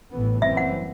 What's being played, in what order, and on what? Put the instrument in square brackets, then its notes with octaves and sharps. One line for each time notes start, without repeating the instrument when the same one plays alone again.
[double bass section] A1 A2 E3 B3
[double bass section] F#1 F#2 E3 G3 C4 [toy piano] E5
[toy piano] F#5